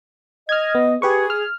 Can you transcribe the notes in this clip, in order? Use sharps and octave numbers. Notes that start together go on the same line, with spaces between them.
D#5 F6 G#6
B3
G4 G#4 B4 C#6
F6